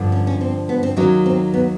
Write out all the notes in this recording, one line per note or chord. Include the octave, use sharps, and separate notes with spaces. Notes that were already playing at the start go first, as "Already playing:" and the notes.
Already playing: G2 D3 F3
C#4
C#4
C4
B3
C4
D#2 D#3 F#3 C#4
C4
B3